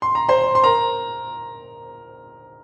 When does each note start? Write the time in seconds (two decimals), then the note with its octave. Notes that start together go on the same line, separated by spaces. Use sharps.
0.02 C6
0.15 A#5
0.29 C5 C6
0.55 C6
0.64 A#4 A#5